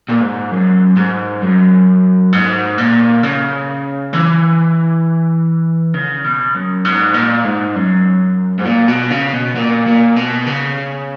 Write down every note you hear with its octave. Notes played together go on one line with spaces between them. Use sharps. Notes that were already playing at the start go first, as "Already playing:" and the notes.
A#2
G#2
F#2
G#2
F#2
G#2
A#2
C#3
E3
C#3
B2
F#2
G#2
A#2
G#2
F#2
G#2
A#2
B2
C#3
B2
A#2
A#2
B2
C#3